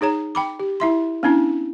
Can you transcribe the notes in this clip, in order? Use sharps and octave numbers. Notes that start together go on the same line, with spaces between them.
D#4 G#4 C#5 A#5
G5 B5 D6
G4
E4 E5 C6
B3 C#4 D4 E4